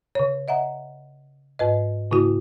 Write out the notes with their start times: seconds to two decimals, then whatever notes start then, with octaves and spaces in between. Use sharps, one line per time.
0.15 C#3 C#5
0.48 D#5 E5 F#5 A#5
1.59 G#2 B4 D#5
2.11 G#2 C#3 A#3 E4 F#4